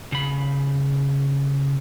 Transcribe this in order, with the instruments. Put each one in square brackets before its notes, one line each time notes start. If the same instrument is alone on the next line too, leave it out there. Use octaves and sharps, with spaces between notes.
[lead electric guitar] C#3 B5